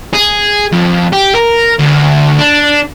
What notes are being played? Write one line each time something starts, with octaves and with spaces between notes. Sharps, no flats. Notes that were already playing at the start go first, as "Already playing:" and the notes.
G#4
F2
G4
A#4
D2
D4